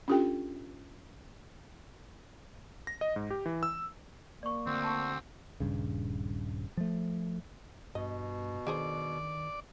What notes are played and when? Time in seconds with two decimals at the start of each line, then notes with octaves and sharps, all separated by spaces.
0.08 C#4 D4 F4 G4 A4 G5
2.87 A#6
3.01 D#5
3.16 G#2
3.30 G4
3.46 E3
3.63 E6
4.43 A#3 D5 C#6
4.67 D2 C4
4.84 A5 C#6
5.60 D#1 G#1 G2 C#3
6.77 F3 A3
7.95 G2 B2 D#5
8.67 D3 D#3 G#4 C5 D5